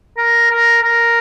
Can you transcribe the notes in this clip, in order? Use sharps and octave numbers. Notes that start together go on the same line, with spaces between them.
A#4
A#4
A#4